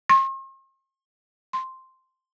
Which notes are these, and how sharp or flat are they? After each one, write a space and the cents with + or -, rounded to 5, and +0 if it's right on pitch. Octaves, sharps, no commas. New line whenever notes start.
C6 +45
C6 +0